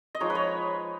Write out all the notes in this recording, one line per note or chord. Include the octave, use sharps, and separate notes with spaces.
D#5
F3 G#3 D#4 C#5
B4
C#5